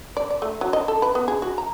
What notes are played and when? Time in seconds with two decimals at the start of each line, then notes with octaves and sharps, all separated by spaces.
0.17 D5
0.30 D5
0.42 A3
0.61 F#3
0.73 D#5
0.88 A4
1.02 B4
1.15 B3
1.28 G#4
1.42 F#4
1.58 A#5